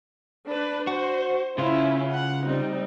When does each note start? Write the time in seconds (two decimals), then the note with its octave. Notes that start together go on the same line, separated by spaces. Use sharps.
0.48 D4 B4
0.87 F#4 C5
1.58 C#3 C#4 E4 F4
2.11 F#5
2.45 G3 C4 D#4